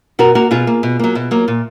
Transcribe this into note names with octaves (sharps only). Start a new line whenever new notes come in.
B2 F#4 A#4
A#3 F#4 A#4
B2 F4 G#4
A#3
B2
F#3 A#3
B2
F#3 A#3
A#2